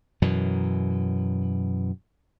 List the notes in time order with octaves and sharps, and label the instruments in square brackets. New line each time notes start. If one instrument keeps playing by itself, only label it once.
[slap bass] F#2 B2 E3